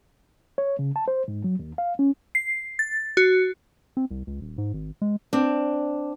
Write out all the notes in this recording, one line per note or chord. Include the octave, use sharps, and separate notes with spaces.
C#5
C#3
A5
C5
G#2
F#3
D#2
F5
C#4
C7
A6
F#4
C4
C2
C#2
D#1
G#2
G#1
G#3
C4 D4